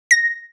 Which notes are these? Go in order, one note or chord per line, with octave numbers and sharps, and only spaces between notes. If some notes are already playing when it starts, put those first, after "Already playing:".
A#6